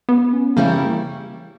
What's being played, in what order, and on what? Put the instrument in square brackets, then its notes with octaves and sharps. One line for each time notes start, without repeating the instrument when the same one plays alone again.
[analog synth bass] B3
C#4
[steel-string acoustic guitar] C#3 G3 C#4 E4 A#4 [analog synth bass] A#3